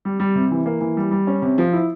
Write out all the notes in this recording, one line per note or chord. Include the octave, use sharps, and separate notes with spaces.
G3
G3
C3
E3
A#3
E3
G3
G3
C#4
C3
F3
E4